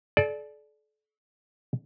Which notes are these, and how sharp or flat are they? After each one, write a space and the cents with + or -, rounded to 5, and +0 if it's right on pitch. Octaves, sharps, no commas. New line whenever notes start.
A4 -40 D5 +0